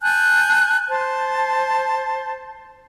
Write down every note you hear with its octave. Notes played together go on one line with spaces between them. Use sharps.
G#5 A5 F#6 G6
C5 A5